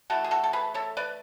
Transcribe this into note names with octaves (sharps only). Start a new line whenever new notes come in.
E3 A3 F#4 A4
G#4
F#4 A4
A4
G#4 B4
A4 C#5
B4 D5